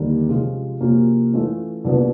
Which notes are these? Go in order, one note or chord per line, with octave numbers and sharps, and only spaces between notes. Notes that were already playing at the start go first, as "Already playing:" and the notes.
Already playing: D#2 D3 G3 A#3
C3 F3 G#3 C#4 F4
C3 F3 A#3 C#4 F#4
E3 A3 C#4 F4
C2 A#2 F#3 B3 D4